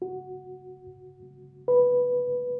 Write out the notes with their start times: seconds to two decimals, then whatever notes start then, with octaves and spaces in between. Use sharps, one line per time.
0.02 F#4
1.68 B4